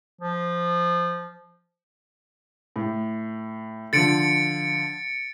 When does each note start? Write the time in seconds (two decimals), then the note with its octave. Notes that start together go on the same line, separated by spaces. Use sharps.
0.21 F3
2.76 A2
3.93 D3 F3 A6 C#7 D7